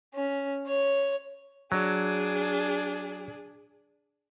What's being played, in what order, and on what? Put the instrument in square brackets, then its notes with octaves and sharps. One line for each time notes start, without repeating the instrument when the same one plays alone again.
[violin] C#4
C#5
[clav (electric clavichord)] F#3 [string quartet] D4 G#4